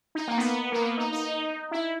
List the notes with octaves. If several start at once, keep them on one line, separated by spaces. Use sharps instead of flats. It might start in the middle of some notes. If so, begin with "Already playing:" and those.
D#4
A#3
B3
A#3
B3
D#4
D#4
E4